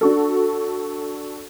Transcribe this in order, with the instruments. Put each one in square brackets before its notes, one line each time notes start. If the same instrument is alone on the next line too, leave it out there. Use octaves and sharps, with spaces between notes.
[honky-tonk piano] D4 F#4 A4